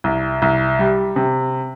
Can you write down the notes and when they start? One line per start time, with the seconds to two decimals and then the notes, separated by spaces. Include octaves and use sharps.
0.04 C2
0.42 C2
0.79 G3
1.16 C3